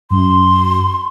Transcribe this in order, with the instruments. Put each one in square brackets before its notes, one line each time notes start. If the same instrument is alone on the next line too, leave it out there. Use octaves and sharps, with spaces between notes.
[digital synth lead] F#2 [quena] C6